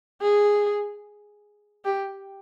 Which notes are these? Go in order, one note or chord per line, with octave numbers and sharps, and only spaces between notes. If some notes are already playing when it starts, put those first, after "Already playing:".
G#4
G4